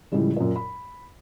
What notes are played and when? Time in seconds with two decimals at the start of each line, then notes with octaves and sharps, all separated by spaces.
0.12 A2 C#3 F3 G3 G#3
0.36 F#2 A#2
0.56 B5